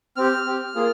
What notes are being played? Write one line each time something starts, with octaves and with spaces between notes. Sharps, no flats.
C4 G4 F6
C4 G4
A#3 F4 G#4